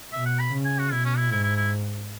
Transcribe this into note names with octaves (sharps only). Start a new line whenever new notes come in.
B2 E5
F#5
B5
C#3
G#5
F#4
B2 E4
C#4
E4
G#2 E4
E4
E4